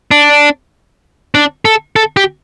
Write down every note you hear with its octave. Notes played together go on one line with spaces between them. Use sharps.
D4
D4
A4
A4
G4